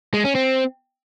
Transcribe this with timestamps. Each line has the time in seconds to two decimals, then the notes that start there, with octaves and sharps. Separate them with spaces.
0.14 G#3
0.24 C#4
0.35 C4